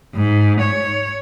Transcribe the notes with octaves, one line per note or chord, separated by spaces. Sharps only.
G#2
C#5